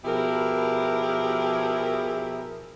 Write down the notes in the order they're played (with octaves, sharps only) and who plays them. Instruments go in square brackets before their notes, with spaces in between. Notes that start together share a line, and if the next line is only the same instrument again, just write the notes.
[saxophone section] B2 F3 E4 G4 G#4 A#4